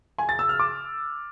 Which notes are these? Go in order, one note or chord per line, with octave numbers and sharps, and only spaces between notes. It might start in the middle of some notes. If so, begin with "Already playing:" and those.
G#5
A6
E6
F6
D6